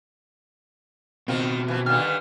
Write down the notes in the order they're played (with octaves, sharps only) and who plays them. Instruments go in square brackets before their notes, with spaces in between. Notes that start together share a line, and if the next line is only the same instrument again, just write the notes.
[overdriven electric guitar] B2 C4 [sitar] D#3 F4
[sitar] E3 F3
[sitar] G2 D3 D#3 [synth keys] F6